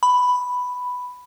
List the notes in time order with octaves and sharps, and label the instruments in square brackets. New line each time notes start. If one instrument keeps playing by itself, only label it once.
[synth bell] B5